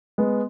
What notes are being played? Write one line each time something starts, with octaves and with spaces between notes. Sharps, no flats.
G#3 B3